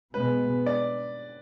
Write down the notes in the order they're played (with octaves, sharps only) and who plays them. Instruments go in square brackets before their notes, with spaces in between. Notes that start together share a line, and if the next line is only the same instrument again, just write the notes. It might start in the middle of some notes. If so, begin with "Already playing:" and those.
[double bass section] B2 G#3 B3 [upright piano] B4
[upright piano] D5